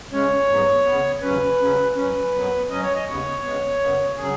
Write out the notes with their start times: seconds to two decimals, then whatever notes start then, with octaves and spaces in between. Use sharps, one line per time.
0.12 C#3 G#3 C#4 C#5
0.48 G#2 F#3 B3
0.85 C#3 B3
1.22 D#2 C#3 F#3 C#4 B4
1.59 C#3 F#3 C#4
1.96 F#2 F#3 C#4 B4
2.32 F#2 F#3 B3
2.69 F#2 F#3 C#4 D#5
2.82 C#5
2.94 D#5
3.07 D#2 C#3 B3 C#5
3.43 C#3 G#3 B3
3.80 F#2 C#3 B3
4.17 C#3 F#3 G#4